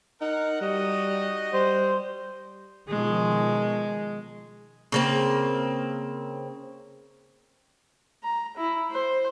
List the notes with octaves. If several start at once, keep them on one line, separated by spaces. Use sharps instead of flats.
D#4 A#4 F#5
G3 D#4 F#4 D#5
G3 C5
B2 D#3 F3 G#3
C#3 A#3 C4
A#5
E4
C5